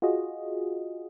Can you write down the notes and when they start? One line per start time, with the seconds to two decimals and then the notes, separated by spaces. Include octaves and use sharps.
0.02 F4 F#4 G#4 D#5